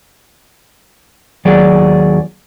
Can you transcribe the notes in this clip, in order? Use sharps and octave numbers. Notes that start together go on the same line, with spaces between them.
D#2 F#3 G#4 D5